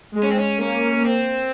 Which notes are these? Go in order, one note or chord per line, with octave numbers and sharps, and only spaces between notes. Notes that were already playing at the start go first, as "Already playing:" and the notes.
G#3
C#4
C4
C#4
A#3 C#4
C4